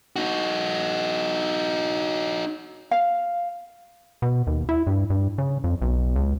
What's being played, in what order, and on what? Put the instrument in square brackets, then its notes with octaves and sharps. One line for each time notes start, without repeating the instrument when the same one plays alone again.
[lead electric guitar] D#4 F#4
[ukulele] F5
[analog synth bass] B2
D#2
E4
G2
G2
C#3
F2
B1
C#2